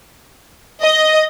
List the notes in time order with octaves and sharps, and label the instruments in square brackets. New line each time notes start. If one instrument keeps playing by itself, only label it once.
[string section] D#5